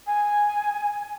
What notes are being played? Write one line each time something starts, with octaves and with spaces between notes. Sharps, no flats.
G#5